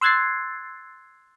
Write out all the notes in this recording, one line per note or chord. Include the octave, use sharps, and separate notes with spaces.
C6 E6 F#6 G#6 A6 C7